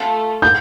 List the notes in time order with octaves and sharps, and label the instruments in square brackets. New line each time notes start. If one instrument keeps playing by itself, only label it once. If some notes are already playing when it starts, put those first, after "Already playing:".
Already playing: [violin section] A3 F4 A4
[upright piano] G6